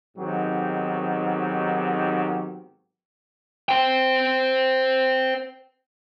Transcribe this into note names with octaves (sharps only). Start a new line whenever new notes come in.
G#2 D#3 F#3 B3 C4 G4
C5 G5